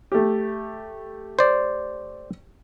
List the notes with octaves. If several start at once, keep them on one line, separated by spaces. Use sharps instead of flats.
A3 G4
C5 D5